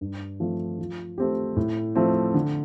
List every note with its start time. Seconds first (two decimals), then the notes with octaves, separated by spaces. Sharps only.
0.01 G2
0.40 F3 A3 C4
0.79 F3
1.18 A3 C4 G4
1.56 A2
1.96 F3 A3 C4
2.34 D3